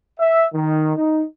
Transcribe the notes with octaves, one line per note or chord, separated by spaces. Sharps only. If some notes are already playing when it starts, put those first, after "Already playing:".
E5
D#3
D#4